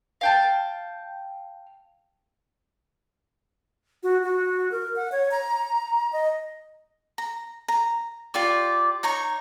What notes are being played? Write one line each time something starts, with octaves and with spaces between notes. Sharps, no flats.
F5 G5 A5
F#4
F#4
A#4
F#5
C#5
A#5
D#5
A#5
A#5
F4 G4 D5 C#6
D#4 C#5 A#5 C#6